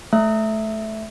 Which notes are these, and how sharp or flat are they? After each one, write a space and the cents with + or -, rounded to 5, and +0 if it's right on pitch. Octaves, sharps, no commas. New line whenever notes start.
A3 -20 E5 +0